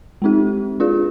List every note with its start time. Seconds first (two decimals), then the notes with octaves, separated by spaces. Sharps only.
0.22 G#3 C4 D#4 G4
0.80 D4 F4 G#4